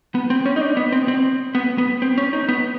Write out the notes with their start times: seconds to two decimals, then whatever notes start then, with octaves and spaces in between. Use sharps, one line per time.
0.15 B3
0.30 C4
0.46 C#4
0.56 D#4
0.61 D4
0.77 B3
0.92 C4
1.08 C4
1.55 B3
1.78 B3
2.02 C4
2.18 C#4
2.33 D#4
2.49 B3